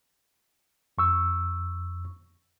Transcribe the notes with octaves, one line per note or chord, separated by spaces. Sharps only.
F2 C#6 E6